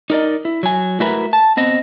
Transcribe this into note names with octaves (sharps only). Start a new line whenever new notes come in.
D#4 A#4 D5 D#5
E4
F#3 G#5
A3 E4 F#4 A#4 B4 E5
A5
B3 C4 D#5